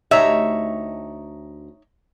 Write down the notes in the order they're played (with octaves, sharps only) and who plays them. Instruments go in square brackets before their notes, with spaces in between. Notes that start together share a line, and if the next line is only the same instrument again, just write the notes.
[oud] D2 G4 D#5 [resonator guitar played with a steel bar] D#4 C#5 E5